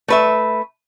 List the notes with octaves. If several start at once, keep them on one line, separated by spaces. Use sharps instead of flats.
A3 B4 E5